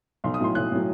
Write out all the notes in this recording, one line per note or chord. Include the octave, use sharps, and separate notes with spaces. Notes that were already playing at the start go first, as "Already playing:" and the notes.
B1 C6
D#6
A2 F#3 C6
B1 F#6
A2 F#3